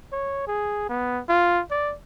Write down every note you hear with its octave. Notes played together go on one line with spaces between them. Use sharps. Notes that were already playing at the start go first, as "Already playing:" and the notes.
C#5
G#4
B3
F4
D5